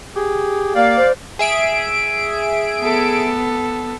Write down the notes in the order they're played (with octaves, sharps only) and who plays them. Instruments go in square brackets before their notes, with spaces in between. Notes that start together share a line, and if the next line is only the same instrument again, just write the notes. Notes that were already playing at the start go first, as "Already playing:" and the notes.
[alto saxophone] G4 [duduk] G#4
[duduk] A#3 [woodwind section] D5 F5
[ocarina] C5
[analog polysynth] G#4 E5 D7
[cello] B3 A4